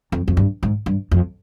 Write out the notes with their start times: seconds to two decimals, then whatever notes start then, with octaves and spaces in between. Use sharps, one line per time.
0.12 F2
0.28 F2
0.37 G2
0.63 G#2
0.86 G2
1.11 F2